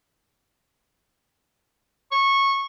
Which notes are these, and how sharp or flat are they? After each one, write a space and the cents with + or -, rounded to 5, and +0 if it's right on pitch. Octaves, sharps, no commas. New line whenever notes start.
C#6 -15